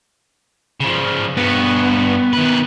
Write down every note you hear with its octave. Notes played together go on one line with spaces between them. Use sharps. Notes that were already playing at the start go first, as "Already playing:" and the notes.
C#3 F3
G2 B3 F#4
D#3 B4